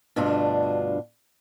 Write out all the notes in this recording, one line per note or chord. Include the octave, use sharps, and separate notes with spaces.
D2 G2 B2 D4 F4